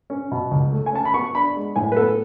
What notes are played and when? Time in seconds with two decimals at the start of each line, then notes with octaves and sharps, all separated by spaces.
0.10 C#4
0.31 B2
0.51 C#2
0.72 A3
0.86 G#5
0.93 C#4 A5
1.05 B5
1.14 B3 C#6
1.35 D4 B5
1.56 G#3
1.76 A2 G#5
1.92 B4
1.96 B3 A4